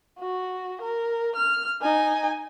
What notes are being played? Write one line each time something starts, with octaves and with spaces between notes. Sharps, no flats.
F#4
A#4
F6
D#4 G#5